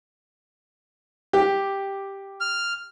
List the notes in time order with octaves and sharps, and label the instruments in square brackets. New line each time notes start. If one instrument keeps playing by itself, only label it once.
[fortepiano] G4
[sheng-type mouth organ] F6